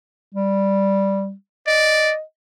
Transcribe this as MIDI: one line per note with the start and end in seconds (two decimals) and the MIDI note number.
0.34 1.33 55
1.67 2.13 74
1.67 2.22 75